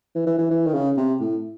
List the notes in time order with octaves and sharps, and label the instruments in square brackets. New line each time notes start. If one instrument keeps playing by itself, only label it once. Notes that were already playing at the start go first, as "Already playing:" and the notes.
[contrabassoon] E3
E3
E3
E3
D#3
C#3
C3
A2